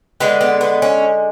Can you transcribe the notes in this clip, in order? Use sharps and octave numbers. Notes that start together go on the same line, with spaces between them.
D3 G#3 B3
B3
B3
C#4